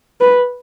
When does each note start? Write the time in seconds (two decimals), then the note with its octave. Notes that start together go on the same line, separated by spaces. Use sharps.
0.20 B4